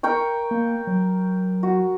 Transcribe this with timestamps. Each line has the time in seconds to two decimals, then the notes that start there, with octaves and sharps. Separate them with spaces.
0.03 A#4 G5 C#6
0.51 A#3
0.87 F#3
1.63 F#4